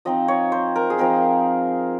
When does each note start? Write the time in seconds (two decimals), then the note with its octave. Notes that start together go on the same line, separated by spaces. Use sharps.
0.05 F3 C4 D#4 D#5
0.28 C#5
0.52 C5
0.76 A#4
0.90 G#4
0.98 F3 C4 D#4 A#4